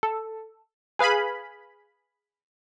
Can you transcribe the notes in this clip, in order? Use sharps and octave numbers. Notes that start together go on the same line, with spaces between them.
A4
G#4 B4 F5 G#5 B5